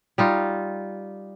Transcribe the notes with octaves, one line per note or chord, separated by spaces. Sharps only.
G3 D#4 F4